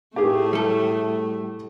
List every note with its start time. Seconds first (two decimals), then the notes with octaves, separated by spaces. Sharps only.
0.16 A2 A3 G4 G#4
0.53 G3 A4